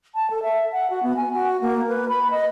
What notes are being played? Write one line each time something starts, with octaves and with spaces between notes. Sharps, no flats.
A5
A4
E5
F#5
F#4
B3
G#5
F#4
A#3
B4
B5
D#5